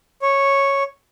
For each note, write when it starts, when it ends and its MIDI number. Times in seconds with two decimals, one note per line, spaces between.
0.22 0.83 73